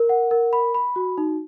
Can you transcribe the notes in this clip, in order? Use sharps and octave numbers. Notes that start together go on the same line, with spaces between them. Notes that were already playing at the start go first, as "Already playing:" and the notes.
Already playing: A#4
F#5
A#4
B5
B5
F#4
D#4